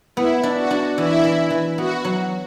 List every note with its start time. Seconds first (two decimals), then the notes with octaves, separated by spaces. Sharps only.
0.16 B3 E4
0.43 D4
0.57 F#4
0.71 D4
0.97 E3 E4
1.24 E3
1.50 E3
1.78 B3 F#4
2.05 F#3